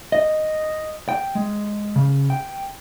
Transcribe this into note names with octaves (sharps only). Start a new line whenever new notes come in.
D#5
G5
G#3
C#3
G5